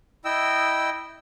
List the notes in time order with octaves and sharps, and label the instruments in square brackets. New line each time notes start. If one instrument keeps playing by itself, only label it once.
[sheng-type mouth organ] E4 D#5 G5 E6